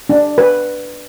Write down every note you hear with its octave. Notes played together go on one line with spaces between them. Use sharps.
D4
B4